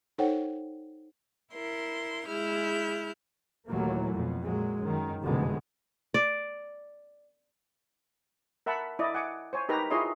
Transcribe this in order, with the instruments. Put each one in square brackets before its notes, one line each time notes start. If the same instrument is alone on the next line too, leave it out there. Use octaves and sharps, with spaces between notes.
[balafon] D#4 A4 C5 C#5 F#5 G5
[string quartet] E4 A#4 C6
G#3 E4 G#4 F6 G6
[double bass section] D#2 A#2 E3 F#3 A3 A#3
F2 B2
A#2 F#3 G#3
F#2 D#3
F1 D2 B2 D3 G#3
[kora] D5
[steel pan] A#4 E5 F#5 A5 B5
E4 D5 D#5
F#5 G#5 D6
C5 C#5 G#5
D#4 G4 A#4 B4 A#5
E4 F4 G#4 C#5 D#5 C6